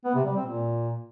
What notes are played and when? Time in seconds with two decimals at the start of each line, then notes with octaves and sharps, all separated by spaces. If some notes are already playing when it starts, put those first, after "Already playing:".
0.04 B3
0.15 C3
0.25 G3
0.35 C4
0.46 A#2